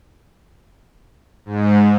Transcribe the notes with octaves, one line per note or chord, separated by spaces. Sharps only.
G#2